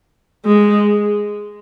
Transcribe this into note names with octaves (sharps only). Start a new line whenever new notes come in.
G#3